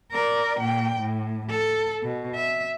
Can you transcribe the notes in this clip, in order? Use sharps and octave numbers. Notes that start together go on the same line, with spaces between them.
A#4 D5
A#2 G5
A2
A4
B2
E5